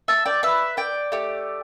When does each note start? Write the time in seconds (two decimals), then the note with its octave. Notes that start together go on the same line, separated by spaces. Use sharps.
0.08 E5 A5
0.25 D5 G5
0.43 B4 E5
0.77 D5 G5
1.12 A3 G4